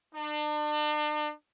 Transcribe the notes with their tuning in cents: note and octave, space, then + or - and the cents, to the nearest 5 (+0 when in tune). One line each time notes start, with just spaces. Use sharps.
D4 +40